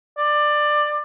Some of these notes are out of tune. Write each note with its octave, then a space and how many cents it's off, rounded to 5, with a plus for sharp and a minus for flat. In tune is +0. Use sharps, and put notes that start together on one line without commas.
D5 +15